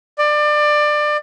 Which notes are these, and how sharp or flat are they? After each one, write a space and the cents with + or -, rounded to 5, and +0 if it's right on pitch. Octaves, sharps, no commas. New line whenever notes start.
D5 +25